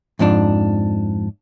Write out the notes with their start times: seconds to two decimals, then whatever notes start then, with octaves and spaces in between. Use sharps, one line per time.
0.19 F2 G#2 F3 D4